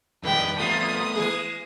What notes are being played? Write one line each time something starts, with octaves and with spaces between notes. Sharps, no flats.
F2 D#3 G3 G#3 B4 G5
E2 A3 B3 F4 D#6
E3 G#3 G#4